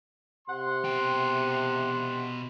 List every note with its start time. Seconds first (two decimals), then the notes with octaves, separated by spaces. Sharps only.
0.48 C3 F#5 C6
0.84 B2 G5